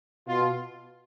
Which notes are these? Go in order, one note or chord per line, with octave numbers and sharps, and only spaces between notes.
B2 F4